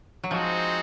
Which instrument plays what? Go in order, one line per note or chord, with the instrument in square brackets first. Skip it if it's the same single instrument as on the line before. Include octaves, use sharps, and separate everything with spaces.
[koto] F#3
[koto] F3 [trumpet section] G#3 C4 D#4 F#4